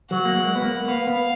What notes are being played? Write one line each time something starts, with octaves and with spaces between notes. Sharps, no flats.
F#3 F#5
A#3
G#3
B3
A#3
B3 F5
B3